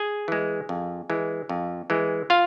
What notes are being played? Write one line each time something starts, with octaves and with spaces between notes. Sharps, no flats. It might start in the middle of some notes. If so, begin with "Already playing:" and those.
Already playing: G#4 G#5
E3 G#3
F2
E3 G#3
F2
E3 G#3
F4 F5